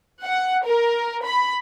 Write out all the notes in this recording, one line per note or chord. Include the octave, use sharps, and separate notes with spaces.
F#5
A#4
B5